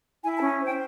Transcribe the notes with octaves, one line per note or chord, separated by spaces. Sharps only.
E4 G#5
A5
C#4
C5 G5